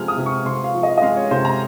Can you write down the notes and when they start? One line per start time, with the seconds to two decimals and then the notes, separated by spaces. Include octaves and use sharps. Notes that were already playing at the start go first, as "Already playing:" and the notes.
Already playing: C3 F3 G#3 F6
0.08 D#6
0.17 C3
0.26 C#6
0.45 C3 C6
0.64 F5
0.74 F3
0.83 D#5
0.97 D#5
1.02 G#3 F5
1.17 C#5
1.31 C3 C5
1.45 A#5